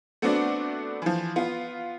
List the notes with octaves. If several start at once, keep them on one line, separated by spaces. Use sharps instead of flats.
A3 B3 C4 D4 F#4 D5
E3 F3
B3 F4